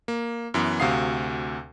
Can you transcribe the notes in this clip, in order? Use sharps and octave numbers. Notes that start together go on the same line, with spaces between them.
A#3
F#2 E3 B3
D2 C3 F#4 F5 D#6 C7